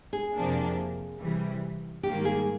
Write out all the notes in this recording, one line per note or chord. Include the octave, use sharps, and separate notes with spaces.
G#4
F2 C3 F3 A#3 D4
C3 E3 G3
G#2 D#3 G3 A#3 G4
G#4